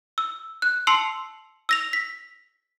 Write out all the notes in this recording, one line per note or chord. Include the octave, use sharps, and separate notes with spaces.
E6
F#6
A5 C6 E6 C7 C#7 F7
E6 A#6 F7
B6